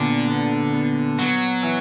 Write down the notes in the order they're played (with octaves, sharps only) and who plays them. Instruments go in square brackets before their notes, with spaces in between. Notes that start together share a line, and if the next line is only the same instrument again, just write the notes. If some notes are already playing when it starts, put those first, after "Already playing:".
Already playing: [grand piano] A#2 B3 [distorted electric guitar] D3
[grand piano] B3
B3
[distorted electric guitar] F#3 [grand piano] B3
[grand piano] E3